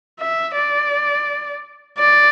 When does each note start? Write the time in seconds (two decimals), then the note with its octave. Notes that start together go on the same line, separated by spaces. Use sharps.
0.20 E5
0.56 D5
1.98 D5